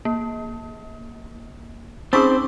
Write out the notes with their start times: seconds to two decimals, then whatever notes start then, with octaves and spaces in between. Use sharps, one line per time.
0.05 A#3
2.13 C4 C#4 D#4 G#4 C5 C#6 D6 E6